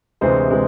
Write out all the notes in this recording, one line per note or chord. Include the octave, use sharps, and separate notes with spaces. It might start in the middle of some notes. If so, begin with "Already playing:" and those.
D2 C3 E3 G#3 C5
C3 E3 G#3